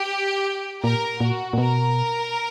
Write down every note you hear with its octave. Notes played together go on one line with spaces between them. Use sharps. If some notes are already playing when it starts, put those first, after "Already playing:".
Already playing: G4
A#2 A#4
A#2 F#4
A#2
B2 A#4